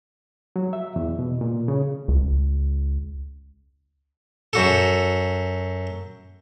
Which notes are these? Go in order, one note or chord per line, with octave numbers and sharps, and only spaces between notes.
F#3
E5
E2
B2
A#2
C#3
C#2
F#2 F#4 A4